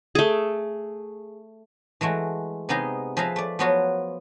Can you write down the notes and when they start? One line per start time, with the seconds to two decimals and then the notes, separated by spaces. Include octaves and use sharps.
0.15 A3 G#4
2.01 E3 G#3 A3 F#4
2.69 C3 B3 D#4 G#4 A#5
3.17 F3 G#4 B4 E5 F5 A#5
3.36 A3 D5
3.59 F3 F#3 B3 F4 F#4 C#5